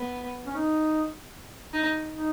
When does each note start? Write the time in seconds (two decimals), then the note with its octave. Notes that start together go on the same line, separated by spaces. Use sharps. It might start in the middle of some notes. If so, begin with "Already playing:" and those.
Already playing: B3
0.47 C#4
0.56 D#4
1.74 D#4
2.12 D#4